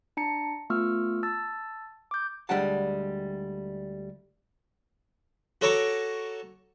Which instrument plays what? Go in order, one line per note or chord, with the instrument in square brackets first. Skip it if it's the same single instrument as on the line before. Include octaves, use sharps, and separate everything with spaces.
[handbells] D4 A5 A#5 C#7
A3 B3 F4 C#6 E6 F6
A5 E6 A6
D6 G6
[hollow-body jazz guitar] D2 G3 G#3 D4 F#5 A5
[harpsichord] F#4 A4 C#5 A#5 C#6 D6